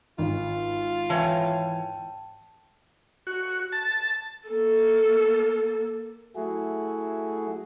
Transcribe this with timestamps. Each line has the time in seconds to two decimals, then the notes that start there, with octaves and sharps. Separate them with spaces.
0.19 G#1 F4
1.10 E3 C#5 G5 A5
3.27 F#4
3.72 A5
4.49 A#3 A4
6.35 F#3 A3 E4 F#4 G#4